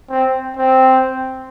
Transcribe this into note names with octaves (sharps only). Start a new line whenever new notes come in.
C4
C4